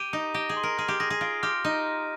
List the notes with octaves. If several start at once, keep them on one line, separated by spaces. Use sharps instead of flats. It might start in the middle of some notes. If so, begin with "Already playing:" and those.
Already playing: G4 D#7
D#4 D#6
G4 A#6
G#4
C6
A#4
G#4 F6
G4
G#4 A#6
G#4
F4 D7
G4 F6
D#4 D#7
F6